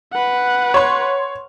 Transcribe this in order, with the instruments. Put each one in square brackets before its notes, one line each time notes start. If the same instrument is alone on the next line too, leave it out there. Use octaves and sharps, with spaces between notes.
[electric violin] B4 F#5
[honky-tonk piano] C#5 C6